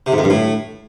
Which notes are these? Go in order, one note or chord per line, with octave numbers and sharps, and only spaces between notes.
C3
G#2
F2
G2
A2